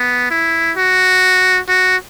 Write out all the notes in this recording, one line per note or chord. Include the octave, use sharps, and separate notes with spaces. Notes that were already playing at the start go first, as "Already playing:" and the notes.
Already playing: B3
E4
F#4
F#4